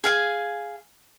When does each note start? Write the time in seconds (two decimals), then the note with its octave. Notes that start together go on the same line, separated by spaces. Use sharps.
0.04 G#4 F5 G#5